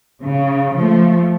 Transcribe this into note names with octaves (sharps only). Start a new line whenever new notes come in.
C#3
F3 A3